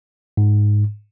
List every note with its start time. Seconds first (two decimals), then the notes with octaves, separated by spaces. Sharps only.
0.37 G#2